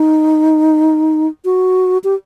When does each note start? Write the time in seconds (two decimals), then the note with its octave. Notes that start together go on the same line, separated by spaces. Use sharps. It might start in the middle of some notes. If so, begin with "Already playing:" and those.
Already playing: D#4
1.45 F#4
2.04 G4